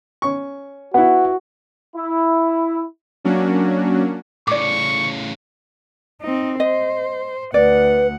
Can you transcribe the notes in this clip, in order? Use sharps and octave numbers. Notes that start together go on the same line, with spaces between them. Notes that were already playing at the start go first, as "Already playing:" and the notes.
C#4 C#6
B3 E4 F#4 F#5
E4
F#3 A#3 C#4 D4 F#4
A2 C#3 D5 C#6 D6
C4 D#4
C5 D#5
D2 B4 D5 F#5